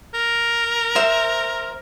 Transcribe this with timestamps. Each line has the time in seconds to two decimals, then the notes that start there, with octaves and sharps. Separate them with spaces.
0.14 A#4
0.95 C5 E5